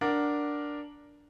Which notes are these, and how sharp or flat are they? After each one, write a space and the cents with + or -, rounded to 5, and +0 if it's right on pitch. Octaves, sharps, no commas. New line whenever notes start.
D4 +0 A#4 +5 F#5 +0